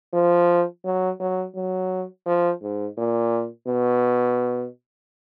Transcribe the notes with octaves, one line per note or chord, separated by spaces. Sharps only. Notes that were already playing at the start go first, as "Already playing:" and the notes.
F3
F#3
F#3
F#3
F3
G#2
A#2
B2